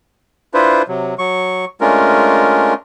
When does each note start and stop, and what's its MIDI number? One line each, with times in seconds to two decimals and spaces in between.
0.54 0.82 62
0.54 0.82 64
0.54 0.82 65
0.54 0.82 71
0.54 0.82 72
0.88 1.14 48
0.88 1.14 54
1.19 1.65 54
1.19 1.65 85
1.81 2.74 56
1.81 2.74 57
1.81 2.74 61
1.81 2.74 62
1.81 2.74 65
1.81 2.74 70